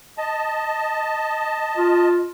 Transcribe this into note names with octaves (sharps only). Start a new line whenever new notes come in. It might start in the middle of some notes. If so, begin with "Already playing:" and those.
D#5 A5
F4